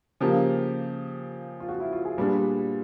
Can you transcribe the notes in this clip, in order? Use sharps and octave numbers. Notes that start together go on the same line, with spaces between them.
C#3 F3 A#3 G4
F4
F#4
E4
F4
G#4
A#2 G3 B3 D4